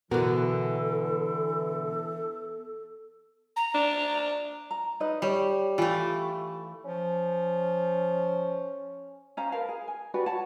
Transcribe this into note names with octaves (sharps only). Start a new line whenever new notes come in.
B2 D3 E3 B3 F#4 A4 A#4
A#5
D4
A#5
D#4 B4 D#5
G3 G4 C#5
E3 A3 F4 G4
F3 C#4
C#4 C5 F5 A#5
A#4 B4 F5 A5
G#4
G#5
D4 F#4 G4 B4
F#4 C#5 F#5 A5